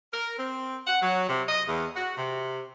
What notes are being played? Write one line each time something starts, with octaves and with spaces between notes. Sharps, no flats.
A#4
C4
F#5
F#3
C3
D#5
E2
F#4
C3